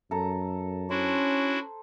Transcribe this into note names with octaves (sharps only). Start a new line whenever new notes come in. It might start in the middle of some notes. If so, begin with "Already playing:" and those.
F#2 A4 A#5
C#4 D4 E4 F#4 C5